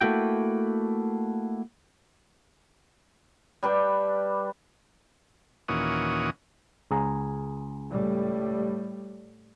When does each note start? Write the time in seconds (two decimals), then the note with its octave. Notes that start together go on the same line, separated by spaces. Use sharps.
0.01 A3 A#3 E4 F#4 G5
3.63 G3 D4 B4 G5
5.68 D#2 A#2 E3 C#4 F#4 D#6
6.91 C#2 G#4 A#5
7.91 A2 G3